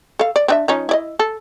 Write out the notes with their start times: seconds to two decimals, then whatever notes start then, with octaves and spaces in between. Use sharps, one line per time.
0.19 A4 F5
0.36 D5
0.48 C4 D4 E5
0.68 F3 C#4 D#4
0.89 E4 D5 D#5
1.19 A4